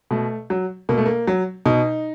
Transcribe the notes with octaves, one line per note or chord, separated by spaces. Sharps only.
B2 A3
F#3
B2 A#3
A3
A#3
F#3
B2 D#4